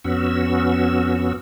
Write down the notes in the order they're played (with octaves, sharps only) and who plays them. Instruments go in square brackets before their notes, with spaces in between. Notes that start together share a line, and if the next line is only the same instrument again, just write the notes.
[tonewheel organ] F2 B3 C#4 F#4 E6